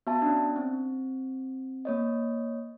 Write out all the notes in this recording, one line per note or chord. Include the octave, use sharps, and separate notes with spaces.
B3 F#4 E5 A5
C#4 D4
C4
A#3 C#5 D#5